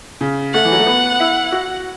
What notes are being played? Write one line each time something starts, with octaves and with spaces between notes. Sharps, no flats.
C#3
A3 F#5
E3
F#3
A3
B3
E4
F#4